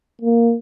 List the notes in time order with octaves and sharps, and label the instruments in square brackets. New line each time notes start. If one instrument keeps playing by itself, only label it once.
[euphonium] A#3